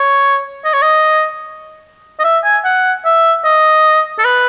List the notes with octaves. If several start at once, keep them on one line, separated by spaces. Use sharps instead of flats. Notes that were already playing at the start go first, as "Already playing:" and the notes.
Already playing: C#5
D#5
C#5
D#5
D#5
E5
G#5
F#5
E5
D#5
A4
B4